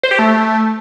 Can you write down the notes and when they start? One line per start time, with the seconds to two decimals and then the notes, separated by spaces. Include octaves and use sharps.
0.03 C5
0.11 G4
0.19 A3